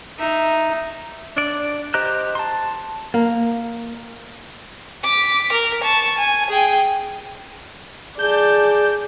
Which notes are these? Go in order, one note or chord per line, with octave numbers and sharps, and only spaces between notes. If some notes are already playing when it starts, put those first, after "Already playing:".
D#4 E5
D4 D5
G4 C5 D#5 A#5 F#6
A5 C6
A#3
D6 B6
A#4
A5 C#6
G#5
G#4 G5
G#4 D5 A5 G6